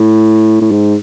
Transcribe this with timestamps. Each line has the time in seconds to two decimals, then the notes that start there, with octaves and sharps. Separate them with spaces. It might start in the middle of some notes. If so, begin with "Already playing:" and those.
Already playing: A2
0.61 A2
0.71 G#2